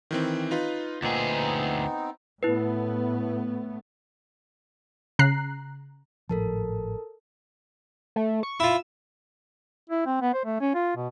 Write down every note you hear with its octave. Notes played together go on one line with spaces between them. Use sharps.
D#3 E3 C4
D#4 F4 B4
D2 A#2 B3 C4 D#4 G#4
A2 A3 B3 E4 B4
C#3 A#5 F#6 C7
G#1 A2 F3 A4 A#4 A5
A3
C#6
E4 F4 E6
E4
C4
B3
C5
A3
C#4
F4
B2